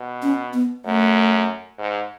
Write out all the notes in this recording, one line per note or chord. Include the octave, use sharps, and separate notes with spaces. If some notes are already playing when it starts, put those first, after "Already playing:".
Already playing: B2
C#4
B3
F#2 A3
G#2